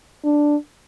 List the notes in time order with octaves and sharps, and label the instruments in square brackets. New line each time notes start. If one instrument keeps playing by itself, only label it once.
[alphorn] D4